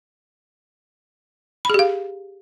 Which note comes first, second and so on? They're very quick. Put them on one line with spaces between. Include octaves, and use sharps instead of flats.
B5 G#4 G4 F5